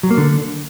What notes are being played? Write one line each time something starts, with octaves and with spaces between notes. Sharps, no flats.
F#3
A#3
D3